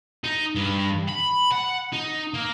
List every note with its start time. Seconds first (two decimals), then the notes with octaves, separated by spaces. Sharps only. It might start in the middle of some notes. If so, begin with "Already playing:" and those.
0.24 D#4
0.55 G2
1.09 B5
1.52 F#5
1.92 D#4
2.34 A#3